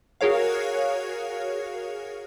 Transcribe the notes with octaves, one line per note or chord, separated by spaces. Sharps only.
F#4 G#4 A#4 C#5 F5